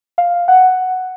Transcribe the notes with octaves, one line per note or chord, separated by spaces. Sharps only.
F5
F#5